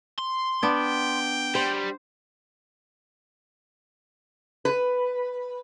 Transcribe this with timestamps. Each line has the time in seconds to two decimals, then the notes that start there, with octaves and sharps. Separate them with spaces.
0.19 C6
0.63 B3 D4 G5
1.55 G3 C5
4.65 B4